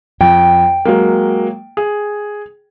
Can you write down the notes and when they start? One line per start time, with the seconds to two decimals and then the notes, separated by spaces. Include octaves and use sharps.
0.21 F2 G5
0.85 F#3 G#3 A#3
1.77 G#4